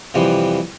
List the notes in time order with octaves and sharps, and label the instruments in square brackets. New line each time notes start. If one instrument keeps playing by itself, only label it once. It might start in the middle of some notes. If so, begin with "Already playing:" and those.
[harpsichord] F2 C3 E3 G3